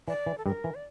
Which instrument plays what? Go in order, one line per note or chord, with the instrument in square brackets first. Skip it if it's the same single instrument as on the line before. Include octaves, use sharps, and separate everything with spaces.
[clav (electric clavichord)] E3 [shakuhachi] D5
[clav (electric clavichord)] E3
[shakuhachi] A4
[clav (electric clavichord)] G2 G3 [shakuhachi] A#4
[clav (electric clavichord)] E3
[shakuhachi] D5